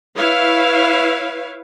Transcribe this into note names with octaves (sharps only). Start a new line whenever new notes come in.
E4 B4 C#5 F5